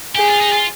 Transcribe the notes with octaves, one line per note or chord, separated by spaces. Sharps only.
G4 G#4
F4
D#4
F4